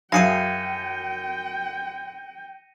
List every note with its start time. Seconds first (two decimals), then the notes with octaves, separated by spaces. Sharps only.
0.12 F#2 E4 G#4 F5 G5 A#6 C#7 D#7